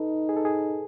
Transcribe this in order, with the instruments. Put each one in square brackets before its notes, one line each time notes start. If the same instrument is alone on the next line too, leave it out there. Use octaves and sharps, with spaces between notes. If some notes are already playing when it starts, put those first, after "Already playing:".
Already playing: [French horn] D#4 [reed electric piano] A4 B4
[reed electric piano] G#4
A4
G#4